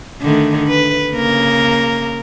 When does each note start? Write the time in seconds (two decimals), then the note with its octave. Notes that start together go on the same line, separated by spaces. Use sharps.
0.22 D3 D#3 A3
0.68 B4
1.15 C#3 A#3 A#4